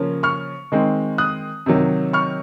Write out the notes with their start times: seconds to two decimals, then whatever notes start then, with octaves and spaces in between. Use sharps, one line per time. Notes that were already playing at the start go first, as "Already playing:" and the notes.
Already playing: C#3 F3 A#3 C#4
0.23 C#6 F6
0.72 D#3 G#3 C4
1.18 D#6 F#6
1.66 C3 D#3 F#3
2.13 C#6 F6